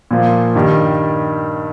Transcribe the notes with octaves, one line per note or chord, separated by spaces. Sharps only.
A#2 F3 A#3
G2 D#3 G3